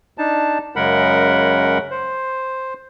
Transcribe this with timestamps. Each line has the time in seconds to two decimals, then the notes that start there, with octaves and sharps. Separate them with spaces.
0.18 D4 D#4 A5
0.76 F#2 C#3 G#3 A#4 F#5 B5
1.91 C5